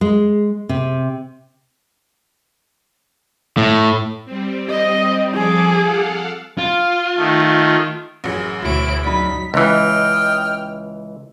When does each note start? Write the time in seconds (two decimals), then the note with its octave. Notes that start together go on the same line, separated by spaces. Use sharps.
0.01 G#3
0.69 C3
3.57 A2
4.25 G3 C4
4.70 D#5
5.34 F3 G#4 A4 D6
5.83 A4 F5 F#5
6.58 F4
7.17 D#3 A3
8.24 A1 F#2 G#4
8.62 D2 B2 E4 F#4 C#5 D7
9.04 F#3 D4 D#4 B4 B6
9.54 C#2 E3 D#5 G5 F6